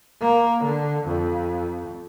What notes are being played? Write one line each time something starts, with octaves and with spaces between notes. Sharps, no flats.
A#3
D3
F2